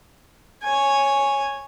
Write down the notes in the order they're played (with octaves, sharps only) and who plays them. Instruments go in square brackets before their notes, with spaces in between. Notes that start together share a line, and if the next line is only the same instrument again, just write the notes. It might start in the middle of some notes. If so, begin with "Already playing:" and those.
[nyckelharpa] C#5 G#5